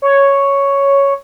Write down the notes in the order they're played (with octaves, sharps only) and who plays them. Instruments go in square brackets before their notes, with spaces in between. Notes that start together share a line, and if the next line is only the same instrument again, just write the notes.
[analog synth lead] C#5